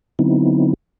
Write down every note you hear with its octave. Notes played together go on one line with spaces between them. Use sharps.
D3 F#3 B3 C4 D#4 E4